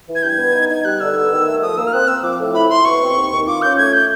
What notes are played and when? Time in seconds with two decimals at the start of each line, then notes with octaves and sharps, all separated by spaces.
0.08 E3
0.15 G#6
0.23 G2 G6
0.29 G#6
0.38 B3
0.54 D#4
0.70 D#4 G#6
0.85 G3 F#6
1.00 D3 E6
1.16 B3
1.32 D#3
1.46 A3
1.62 F3 D#6
1.78 A#3 E6
1.87 F6
1.93 C4 F#6
2.08 C4 E6
2.23 F3 D6
2.39 A2
2.55 E4 B5
2.70 E4 C6
2.85 B2 C#6
3.01 C4
3.16 D#2
3.31 D#3
3.47 F4 D6
3.62 C#4 G6
3.78 A3 G#6
3.93 G6